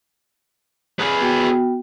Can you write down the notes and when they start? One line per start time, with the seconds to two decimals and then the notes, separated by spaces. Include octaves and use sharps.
1.00 G#4 B4
1.21 B3 F#4 G5